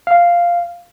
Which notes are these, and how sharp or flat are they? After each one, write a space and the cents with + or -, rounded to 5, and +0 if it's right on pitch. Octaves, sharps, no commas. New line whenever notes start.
F5 -5